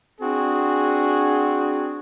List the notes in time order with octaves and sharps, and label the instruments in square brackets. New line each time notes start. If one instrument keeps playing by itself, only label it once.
[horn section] C4 D4 F#4 G#4